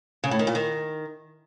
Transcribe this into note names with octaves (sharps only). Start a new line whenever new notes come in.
C#3
A2
D#3
A#2
D#3